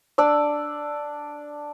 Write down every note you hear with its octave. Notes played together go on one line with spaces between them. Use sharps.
D4 D5 D6 E6